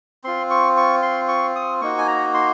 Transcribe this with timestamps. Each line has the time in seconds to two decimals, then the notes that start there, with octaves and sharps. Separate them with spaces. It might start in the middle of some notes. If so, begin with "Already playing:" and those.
0.24 C4 F4 C6
0.50 C#6
0.77 C#6
1.02 C6
1.28 C#6
1.56 D#6
1.81 A#3 D#4 F#4 C#6
1.98 G#5
2.07 A#5
2.34 C6